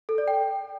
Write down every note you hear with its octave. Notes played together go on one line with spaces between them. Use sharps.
A4
D5
G5